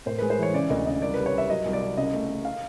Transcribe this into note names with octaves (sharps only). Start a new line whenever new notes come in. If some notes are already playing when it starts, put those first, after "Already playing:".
A2 C5
B4
G#3
C5
E3 C#5
C#3 D5
D2 D#5
C#3 D#5
C2 D5
B4
G3
C#5
G3 E5
F#3 D#5
C2
D5
C2
C#3 D#5
A3
A3
F5